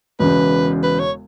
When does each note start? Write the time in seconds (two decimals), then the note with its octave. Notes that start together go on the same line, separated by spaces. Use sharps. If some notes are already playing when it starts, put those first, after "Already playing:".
0.19 E1 E2 C#3 B4
0.83 B4
0.99 C#5